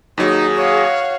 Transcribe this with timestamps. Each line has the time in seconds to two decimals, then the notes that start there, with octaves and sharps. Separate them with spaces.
0.18 D#2 F#3 D#4 G#4
0.56 F#4 C#5 F5